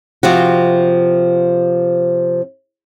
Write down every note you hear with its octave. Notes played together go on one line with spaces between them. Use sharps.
C3 F3 C4 F#4